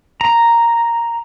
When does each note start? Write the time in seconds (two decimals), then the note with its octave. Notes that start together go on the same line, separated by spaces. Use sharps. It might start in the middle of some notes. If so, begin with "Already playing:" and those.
0.21 A#5